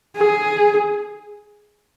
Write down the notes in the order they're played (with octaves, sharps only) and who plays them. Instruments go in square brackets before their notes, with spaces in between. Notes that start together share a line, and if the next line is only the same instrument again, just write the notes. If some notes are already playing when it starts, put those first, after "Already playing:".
[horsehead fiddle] G#4